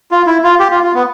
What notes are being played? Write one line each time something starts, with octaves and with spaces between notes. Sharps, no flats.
F4
E4
F4
G4
F4
F4
B3